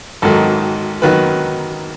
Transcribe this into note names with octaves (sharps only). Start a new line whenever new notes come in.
G#1 G#2 D#3 F#3 A4
D#3 F#3 B4